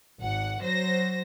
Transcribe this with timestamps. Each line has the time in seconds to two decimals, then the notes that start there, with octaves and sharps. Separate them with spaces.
0.18 G#1 F#5
0.62 F#3 C5 A#6